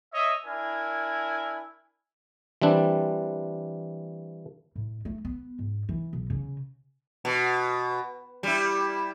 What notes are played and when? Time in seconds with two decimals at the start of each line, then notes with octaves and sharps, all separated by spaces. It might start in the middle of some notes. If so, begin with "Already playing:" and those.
0.13 C#5 D#5 E5
0.45 D4 E4 A#4 G#5
2.62 E3 G3 C4 D4
4.76 A2
5.05 A3
5.25 B3
5.59 G#2
5.89 E3
6.13 B1
6.30 C#3
7.25 B2
8.43 G3 E4